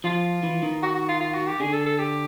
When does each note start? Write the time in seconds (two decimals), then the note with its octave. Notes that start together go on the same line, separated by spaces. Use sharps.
0.04 F3 F4
0.43 E3
0.63 D#3
0.82 F#4
0.95 F#4
1.09 F4
1.20 F4
1.34 F#4
1.47 G4
1.60 D3 G#4
1.73 A4
1.86 A4
1.98 G4